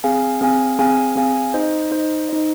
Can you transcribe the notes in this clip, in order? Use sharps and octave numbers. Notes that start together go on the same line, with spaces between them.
C4 G#4 F5 G#5
C4 G#4 F5 G#5
C4 G#4 F5 G#5
C4 G#4 F5 G#5
D#4 C5 D#5
D#4 C5 D#5
D#4 C5 D#5